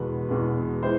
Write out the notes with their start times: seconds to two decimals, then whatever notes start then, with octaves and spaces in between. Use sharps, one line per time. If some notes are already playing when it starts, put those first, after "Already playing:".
Already playing: E2 B2 G#3 B4
0.29 E2 B2 G#3
0.83 E3 G#3 C5